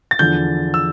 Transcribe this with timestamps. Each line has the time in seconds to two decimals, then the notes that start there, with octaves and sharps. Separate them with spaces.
0.11 A6
0.19 E2 D3 F3 G6
0.74 E6